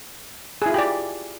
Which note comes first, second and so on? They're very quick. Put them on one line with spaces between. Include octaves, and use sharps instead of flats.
G#4 E4 F4 G4 D5